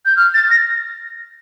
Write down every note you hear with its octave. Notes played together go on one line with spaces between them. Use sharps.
G6
F6
A6
A#6